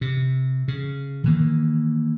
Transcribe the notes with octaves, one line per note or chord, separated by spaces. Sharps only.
C3
C#3
D#3 E3 A#3